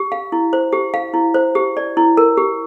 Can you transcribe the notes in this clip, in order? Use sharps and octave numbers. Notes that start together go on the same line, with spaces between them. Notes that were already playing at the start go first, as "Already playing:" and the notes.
Already playing: G4
F5
E4
C5
G4
F5
E4
C5
G4
D5
E4
A#4
G4